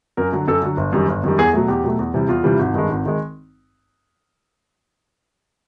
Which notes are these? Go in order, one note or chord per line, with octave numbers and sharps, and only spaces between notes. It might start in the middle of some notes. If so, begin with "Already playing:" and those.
F#2 A#4
D3 F#3
F#2 A4
D3 F#3
G1
F#2 D#3 G3
G1
F#2 D#3 G3
E2 G#4
B2 F#3 A3
E2 G4
B2 F#3 A3
E2
C3 E3 G3
E2 F4
C3 E3 G3
G#1
G2 D#3 G#3
G#1
D#3 G#3